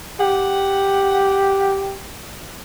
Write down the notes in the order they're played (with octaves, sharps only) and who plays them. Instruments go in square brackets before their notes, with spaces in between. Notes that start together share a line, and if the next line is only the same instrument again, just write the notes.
[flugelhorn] G4 [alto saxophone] F#5